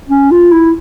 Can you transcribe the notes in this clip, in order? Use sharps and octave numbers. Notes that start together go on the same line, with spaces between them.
C#4
F4
E4